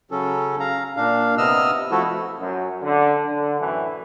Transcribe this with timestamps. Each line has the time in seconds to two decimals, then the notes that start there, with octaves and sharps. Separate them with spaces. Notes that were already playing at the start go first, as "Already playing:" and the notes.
0.11 C#3 F#3 C#4 A4
0.60 F5 A#5
0.97 A#2 D4 F5
1.38 C3 B3 D#5 E6 F6
1.91 F3 A3 E4 F#4 A4
2.39 F#2
2.82 D3
3.25 D3
3.58 F#2 A2 E3